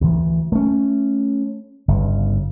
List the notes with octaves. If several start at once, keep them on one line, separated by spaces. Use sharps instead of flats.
D2 E3
A3 C#4
G1 C#3